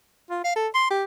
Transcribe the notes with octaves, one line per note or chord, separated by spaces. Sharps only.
F4
F5
A4
C6
G4